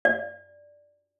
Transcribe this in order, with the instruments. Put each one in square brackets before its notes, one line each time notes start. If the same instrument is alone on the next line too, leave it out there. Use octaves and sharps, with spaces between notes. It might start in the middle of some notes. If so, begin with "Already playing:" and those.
[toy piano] D5